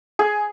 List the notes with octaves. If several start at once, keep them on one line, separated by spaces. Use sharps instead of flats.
G#4